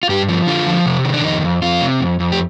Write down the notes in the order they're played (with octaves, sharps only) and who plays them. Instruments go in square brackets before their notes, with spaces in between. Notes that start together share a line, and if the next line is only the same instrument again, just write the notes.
[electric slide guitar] F4
G2 G4
F3
D3 F4
F3
C3
D#3
D4
F2 D#4
F2
F2 F4
C3
F2
F2
G4